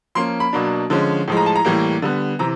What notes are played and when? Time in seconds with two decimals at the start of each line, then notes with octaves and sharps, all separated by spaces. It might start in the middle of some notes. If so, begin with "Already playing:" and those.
0.15 F3 A#3 C#4 C6
0.40 B5
0.53 B2 F#3 A#3 D4
0.90 D3 F3 G#3 C#4
1.28 A2 F3 G#3
1.37 A#5
1.46 A5
1.56 A#5
1.65 A2 E3 G3 A#3
2.02 D3 G3 B3
2.39 C3 E3 A#5